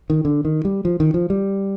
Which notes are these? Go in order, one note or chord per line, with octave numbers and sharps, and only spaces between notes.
D#3
D3
D#3
G3
F3
D#3
F3
G3